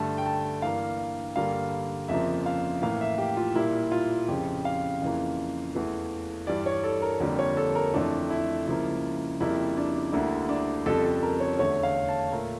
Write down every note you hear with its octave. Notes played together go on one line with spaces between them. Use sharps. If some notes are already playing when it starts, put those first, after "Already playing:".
Already playing: G2 D3 A3 A5
G5
A5
G2 E3 A#3 F5
G2 D3 G3 A#3 F5
F2 C#3 F3 A#3 E5
F5
A2 E3 A#3 F5
E5
G4
F4
A#2 G3 A#3 E4
F4
F2 C#3 F3 G4
F5
F2 C#3 E3 A#3
E2 E3 A3
G2 E3 G3 D5
C#5
A4
A#4
F2 D3 G3 A#3
C#5
A4
A#4
F2 E3 A3 D4
E4
C#2 C#3 F3 A#3 E4
F2 C#3 G3 A#3 E4
D4
D2 D3 G3 A#3 E4
D4
F2 C#3 G3 A4
A4
A#4
C#5
E2 D3 A3 C#5
F5
A5
A#2 A3 A#4